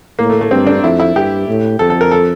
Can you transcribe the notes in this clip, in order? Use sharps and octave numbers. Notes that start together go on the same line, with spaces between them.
A2 A#3
A3
A3
G2 C4
D4
F2 E4
E4
G2 G4
A2
F2 A4
A4
A#4
A4